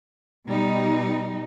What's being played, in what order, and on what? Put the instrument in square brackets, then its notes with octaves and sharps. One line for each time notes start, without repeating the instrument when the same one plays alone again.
[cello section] B2 G3 D#4